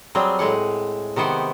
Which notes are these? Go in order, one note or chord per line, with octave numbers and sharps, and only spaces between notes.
F#3 G3 C4 G#4
A2 G#3 G#4 F#5
C3 D#3 B3 C5 F#5